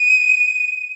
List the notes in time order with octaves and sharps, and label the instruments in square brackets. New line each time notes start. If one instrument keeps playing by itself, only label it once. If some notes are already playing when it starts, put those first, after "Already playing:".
Already playing: [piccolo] D#7